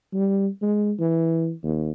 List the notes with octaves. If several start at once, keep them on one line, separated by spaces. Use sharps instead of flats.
G3
G#3
E3
D#2